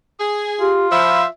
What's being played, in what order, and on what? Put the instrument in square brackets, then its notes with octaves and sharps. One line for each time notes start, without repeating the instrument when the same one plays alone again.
[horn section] G#4
[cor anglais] F4 [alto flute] G4
[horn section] F3 [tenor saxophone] E5 [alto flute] B5